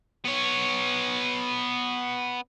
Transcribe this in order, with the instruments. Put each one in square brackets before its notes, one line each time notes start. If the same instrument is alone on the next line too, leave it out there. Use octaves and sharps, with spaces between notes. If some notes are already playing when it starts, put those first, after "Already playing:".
[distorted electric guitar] B3 C#5